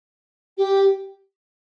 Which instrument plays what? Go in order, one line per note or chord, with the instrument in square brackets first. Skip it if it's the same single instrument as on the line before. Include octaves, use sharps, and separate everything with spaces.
[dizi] G4